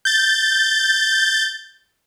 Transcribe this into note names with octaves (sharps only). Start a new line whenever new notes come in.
G6 A6